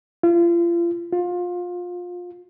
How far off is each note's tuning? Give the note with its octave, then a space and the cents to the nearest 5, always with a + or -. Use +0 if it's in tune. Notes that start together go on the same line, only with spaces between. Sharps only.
F4 -35
F4 +25